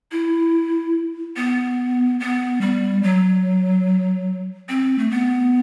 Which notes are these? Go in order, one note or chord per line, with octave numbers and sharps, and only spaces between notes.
E4
B3
B3
G3
F#3
C4
A3
B3